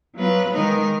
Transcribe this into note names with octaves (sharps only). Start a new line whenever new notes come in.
F#3 B3 F4 B4
D#3 G#3 D#4 A#4